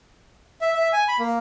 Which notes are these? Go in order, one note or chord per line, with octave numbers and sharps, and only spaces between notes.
E5
E5
G#5
B5
A#3